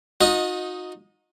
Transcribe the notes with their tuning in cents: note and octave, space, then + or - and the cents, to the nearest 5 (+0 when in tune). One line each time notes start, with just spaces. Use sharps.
D#4 +0 F#4 -40 D#5 +15